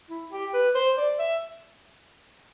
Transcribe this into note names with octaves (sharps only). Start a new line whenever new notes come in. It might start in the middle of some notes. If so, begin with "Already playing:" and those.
E4
G4
B4
C5
D5
E5